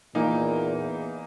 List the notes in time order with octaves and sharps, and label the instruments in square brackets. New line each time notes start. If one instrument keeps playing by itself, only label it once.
[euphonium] E2 [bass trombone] A#2 [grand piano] E3 A#3 D#4